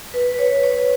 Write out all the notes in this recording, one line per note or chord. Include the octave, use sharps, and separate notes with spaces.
B4
B4
C#5
C#5